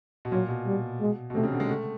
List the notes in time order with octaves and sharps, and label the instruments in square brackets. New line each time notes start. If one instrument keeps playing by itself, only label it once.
[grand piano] B2
[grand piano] A#2 [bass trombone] F#3
[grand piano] B2
[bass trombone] G3
G#3
[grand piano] B2
[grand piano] C3 [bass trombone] A3
[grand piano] C#3
D3
G#3
A3